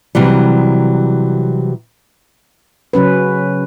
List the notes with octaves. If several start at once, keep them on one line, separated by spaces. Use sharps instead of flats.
C3 E3 F#3 G3
C#3 F#3 C#4 B4